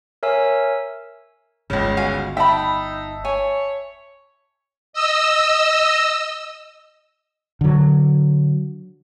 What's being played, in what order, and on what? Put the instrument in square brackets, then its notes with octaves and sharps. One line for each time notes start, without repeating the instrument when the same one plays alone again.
[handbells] A#4 C#5 E5 G#5 E6
[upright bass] G1 [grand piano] C#2 C#3
[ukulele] F#4 F5 G#5
[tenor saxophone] D#4 [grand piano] E5 A5 [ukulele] G5 B5
[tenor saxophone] C#5 [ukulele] G#5
[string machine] D#5 E6
[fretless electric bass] D3 F#3